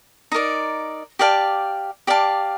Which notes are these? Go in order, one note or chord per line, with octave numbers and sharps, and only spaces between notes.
D#4 A#4 D5
G4 D5 F5 A5
G4 D5 F5 A5